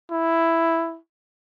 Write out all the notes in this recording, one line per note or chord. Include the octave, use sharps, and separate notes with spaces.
E4